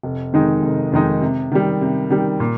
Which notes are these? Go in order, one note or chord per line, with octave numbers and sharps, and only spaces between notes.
F1
F2 D#3 G#3 D#4
F1
F2 D#3 G#3 D#4
C3
D#3 G3
C3
D#3 G3
A#2